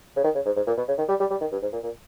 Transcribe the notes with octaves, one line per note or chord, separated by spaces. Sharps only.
C#3
D#3
C#3
G#2
G#2
A#2
B2
C#3
D#3
G3
G3
G3
D#3
G2
G#2
A#2
A#2